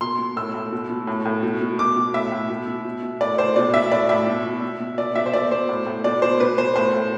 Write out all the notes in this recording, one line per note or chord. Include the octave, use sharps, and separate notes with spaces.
B2 C6
B2
A2 E6
A2
B2
B2
A2
A2
B2
B2
B2 D6
B2
A2 E5
A2
B2
B2
B2
B2
A2 D5
A2 C5
B2 D5
B2 E5
A2 D5
A2 E5
B2
B2
B2
B2
B2 D5
B2 E5
C5
B2 D5
B2 C5
A2
A2
B2 D5
B2 C5
B2 B4
B2 C5
A2 C5
A2